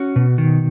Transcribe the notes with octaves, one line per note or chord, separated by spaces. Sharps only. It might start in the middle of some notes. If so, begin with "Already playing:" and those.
Already playing: C#4 F#4
B2
D#3